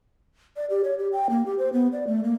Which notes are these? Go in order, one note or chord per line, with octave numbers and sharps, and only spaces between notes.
D5
G4
C#5
G4
G5
A#3
G4
C5
B3
D5
A3
A#3